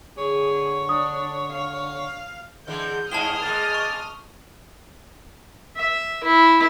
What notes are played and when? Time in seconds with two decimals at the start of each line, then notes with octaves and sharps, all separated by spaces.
0.18 D3 G#4 C#5
0.89 D4 D#6
1.51 F5
2.67 D3 E3 G#3 G6
3.12 G2 E4 G#4 A5 D#6 F6 E7 G7
3.42 G#3 A#3 D5
3.74 C#6
5.76 E5
6.24 E4